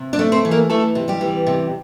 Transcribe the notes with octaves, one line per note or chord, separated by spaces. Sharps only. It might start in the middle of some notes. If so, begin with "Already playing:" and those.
Already playing: C3
D4 D5
A3
C4 C5
E3
A#3 A#4
E3 A3 A4
C3
G3 G4
E3
C3